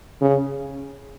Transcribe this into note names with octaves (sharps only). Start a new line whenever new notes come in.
C#3